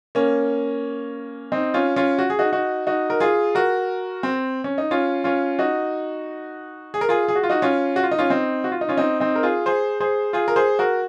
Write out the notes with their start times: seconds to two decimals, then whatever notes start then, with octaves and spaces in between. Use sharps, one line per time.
0.15 A#3 C#4
1.52 C4 D#4
1.74 C#4 F4
1.96 C#4 F4
2.19 F#4
2.30 G#4
2.39 D#4 F#4
2.53 D#4 F#4
2.87 D#4 F#4
3.10 A#4
3.20 F4 G#4
3.55 F#4 A#4
4.23 C4
4.64 C#4
4.78 D#4
4.91 C#4 F4
5.24 C#4 F4
5.59 D#4 F#4
6.94 G#4
7.01 A#4
7.09 F4 G#4
7.28 G#4
7.36 F#4
7.43 F4
7.50 D#4 F#4
7.62 C#4 F4
7.96 F#4
8.03 F4
8.11 D#4
8.19 C#4 F4
8.30 C4 D#4
8.64 F#4
8.72 F4
8.81 D#4
8.89 C#4 F4
8.97 C4 D#4
9.20 C4 D#4
9.36 A#4
9.43 F4 G#4
9.66 G#4 C5
10.00 G#4 C5
10.33 F4 G#4
10.48 A#4
10.56 G#4 C5
10.79 F#4 A#4